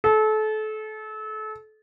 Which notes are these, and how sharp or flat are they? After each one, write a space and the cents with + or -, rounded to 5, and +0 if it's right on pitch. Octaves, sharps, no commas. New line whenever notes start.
A4 -30